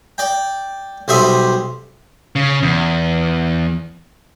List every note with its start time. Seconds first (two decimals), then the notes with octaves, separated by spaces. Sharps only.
0.18 D5 G5
1.08 B1 G3 G4 C5 E5 D#6
2.36 C#3
2.63 E2